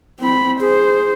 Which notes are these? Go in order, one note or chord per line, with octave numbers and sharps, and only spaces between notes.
C4 B5
G#4 C5